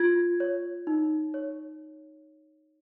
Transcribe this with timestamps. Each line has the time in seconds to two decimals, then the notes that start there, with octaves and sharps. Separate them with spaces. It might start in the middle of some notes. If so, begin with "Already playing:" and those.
Already playing: F4 G#6
0.40 C#5
0.87 D#4
1.34 C#5